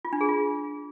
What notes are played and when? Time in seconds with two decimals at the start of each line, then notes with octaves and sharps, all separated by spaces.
0.05 F4
0.13 D4
0.21 G#4
0.29 F4